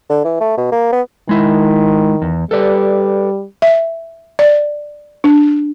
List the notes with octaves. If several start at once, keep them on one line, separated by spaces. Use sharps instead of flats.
D3
E3
A3
B2
A#3
B3
D#3 G#3 E4
E2
G3 A4 B4 D5
E5
D5
D4